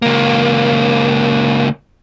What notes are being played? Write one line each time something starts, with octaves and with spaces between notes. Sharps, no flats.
C#2 A#3